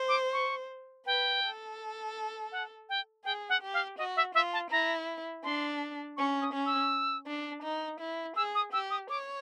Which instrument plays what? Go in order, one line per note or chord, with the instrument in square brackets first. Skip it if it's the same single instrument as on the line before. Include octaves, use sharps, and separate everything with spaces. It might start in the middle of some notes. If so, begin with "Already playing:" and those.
Already playing: [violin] C5
[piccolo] D6
C#6
[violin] B4 [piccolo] G5
[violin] A4
[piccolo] F#5
G5
[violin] G#4 [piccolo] G5
[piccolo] F#5
[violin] G4
[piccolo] F5
[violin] F#4 [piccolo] D#5
[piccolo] E5
[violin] F4 [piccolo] E5
[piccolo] A5
[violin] E4 [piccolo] A#5
[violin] D4 [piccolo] C6
[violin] C#4 [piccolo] C#6
[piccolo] D#6
[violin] C#4
[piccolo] E6
[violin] D4
D#4
E4
[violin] G#4 [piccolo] E6
[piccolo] D#6
[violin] G4 [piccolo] E6
[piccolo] D#6
[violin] C#5 [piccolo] D6